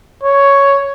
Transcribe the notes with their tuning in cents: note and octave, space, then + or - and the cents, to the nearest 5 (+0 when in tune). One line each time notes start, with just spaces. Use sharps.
C#5 +5